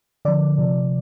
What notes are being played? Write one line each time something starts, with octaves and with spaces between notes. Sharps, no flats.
D3 F3 D5
C3 F3